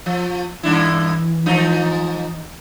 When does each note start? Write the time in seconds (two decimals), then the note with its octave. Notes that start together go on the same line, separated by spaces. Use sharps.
0.06 F3
0.63 G2 E3 D4 E4
1.46 G#2 F3 D#4